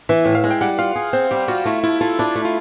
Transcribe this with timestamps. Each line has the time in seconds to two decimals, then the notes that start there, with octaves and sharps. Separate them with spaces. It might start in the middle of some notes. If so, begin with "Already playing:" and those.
0.09 E3 E5
0.25 A2 E5
0.35 F5
0.44 G#3
0.51 G5
0.61 G3 F#5
0.79 F4 F5
0.95 G#4
1.13 C4 C5
1.31 G3 G4
1.48 F4 F#4
1.65 A3 E4
1.83 E4 F4
2.01 F4 A4
2.19 D4 E4
2.35 A3
2.45 F4